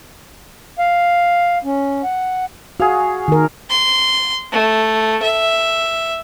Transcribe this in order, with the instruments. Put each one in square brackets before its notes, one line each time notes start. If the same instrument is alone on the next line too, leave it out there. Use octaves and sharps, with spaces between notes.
[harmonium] F5
C#4
F#5
[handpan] F#4 [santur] G#4 F5
[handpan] D#3 A#4
[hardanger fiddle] C6
A3
E5